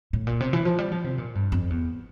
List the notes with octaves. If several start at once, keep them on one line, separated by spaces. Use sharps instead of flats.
A2
A#2
C3
E3
F3
G3
F3
C3
A#2
G2
F2
E2